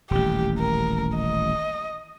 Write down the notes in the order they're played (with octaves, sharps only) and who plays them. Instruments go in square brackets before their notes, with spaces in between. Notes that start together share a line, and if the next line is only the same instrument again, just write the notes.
[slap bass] D#1 A1 [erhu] G4
[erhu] A#4
D#5